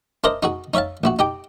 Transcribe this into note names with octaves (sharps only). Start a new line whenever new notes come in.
D4 E4 A#4 C5 D#5
D#4 F#4 G#4
D#4 C#5 E5 F5 A5
A#1 E4 F#4
D#4 G4 G5